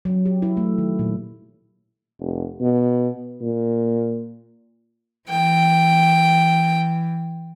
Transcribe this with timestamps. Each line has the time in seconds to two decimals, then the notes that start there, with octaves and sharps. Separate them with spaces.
0.05 F#3
0.25 G4
0.42 E4
0.57 A3
0.78 D#3
0.99 A#2
2.20 F1
2.61 B2
3.42 A#2
5.29 E3 G5